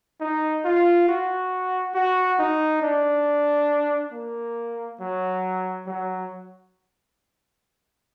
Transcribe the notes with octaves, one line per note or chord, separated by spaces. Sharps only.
D#4
F4
F#4
F#4
D#4
D4
A#3
F#3
F#3